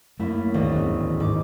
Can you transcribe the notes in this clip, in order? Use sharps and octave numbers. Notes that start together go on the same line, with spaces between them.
F#2 A3 A#3 C4 E4
G#1 D2
E2 B3 C#4
G#2 D6